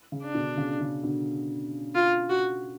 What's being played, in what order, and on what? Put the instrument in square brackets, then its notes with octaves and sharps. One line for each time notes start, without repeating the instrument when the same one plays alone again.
[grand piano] C#3
[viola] D4
[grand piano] B2 D3
C#3
C#3
B2 D3
[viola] F4
F#4